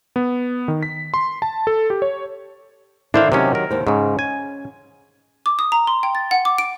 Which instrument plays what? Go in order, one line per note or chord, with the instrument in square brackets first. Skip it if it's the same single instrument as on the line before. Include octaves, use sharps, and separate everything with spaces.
[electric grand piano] B3
D#3
B6
C6
A5
A4
G4
C#5
[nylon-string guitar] D3 D#3 E4 [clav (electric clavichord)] D4 C5 F5
[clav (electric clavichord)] C3 C#4 [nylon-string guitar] D#3 F#3 G4
[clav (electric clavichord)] A#4
[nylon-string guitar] D#2 C5
[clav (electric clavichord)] G#2 C#3 [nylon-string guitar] C#4
[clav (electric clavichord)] G#5
[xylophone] D6
D#6
A#5
C6
G5
A6
F#5
D6
D7